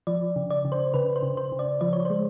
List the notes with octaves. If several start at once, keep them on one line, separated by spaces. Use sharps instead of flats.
F3 D5
C#3
D5
C#3
C5
C#3 B4
C5
C#3
C5
C#3
D5
F3 D5
C#5
G#3 C5